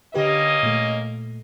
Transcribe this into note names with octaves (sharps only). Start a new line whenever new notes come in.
D3 A#3 C#4 G4 B4 D#5
A#2 A3